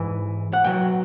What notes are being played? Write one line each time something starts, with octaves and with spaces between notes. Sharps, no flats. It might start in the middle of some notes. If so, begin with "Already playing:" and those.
Already playing: G#2 E3
F#5
B1 B2 F#3 G5